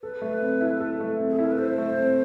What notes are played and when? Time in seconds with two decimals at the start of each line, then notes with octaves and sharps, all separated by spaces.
0.02 A4 B4
0.22 A3
0.41 C4
0.61 E4
0.80 A4
1.00 A3
1.19 C4
1.30 G#4
1.37 E4 A4
1.44 A#4
1.51 B4
1.58 A4 C5
1.78 A3
1.98 C4